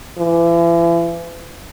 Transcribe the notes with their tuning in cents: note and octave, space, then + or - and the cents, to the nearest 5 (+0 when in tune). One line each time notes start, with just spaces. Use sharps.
E3 +40